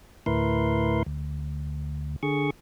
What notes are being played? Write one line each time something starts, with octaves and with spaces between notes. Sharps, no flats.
D2 A2 E4 A#4 B4 C6
D2
D3 G#4 C#6